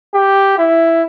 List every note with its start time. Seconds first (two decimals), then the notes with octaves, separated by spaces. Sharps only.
0.14 G4
0.58 E4